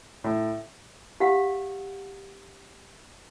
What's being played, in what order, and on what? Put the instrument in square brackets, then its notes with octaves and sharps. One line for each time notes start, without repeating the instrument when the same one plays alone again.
[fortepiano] A2
[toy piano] G4 F5 F#5